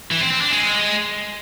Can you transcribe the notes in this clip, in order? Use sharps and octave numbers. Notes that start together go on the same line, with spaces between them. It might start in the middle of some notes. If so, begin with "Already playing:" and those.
E3
C4
C4
D4
G#3